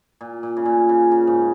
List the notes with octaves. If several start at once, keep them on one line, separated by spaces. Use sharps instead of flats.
A#2
A#2
C#3
A#2
C#3
C#3
G#2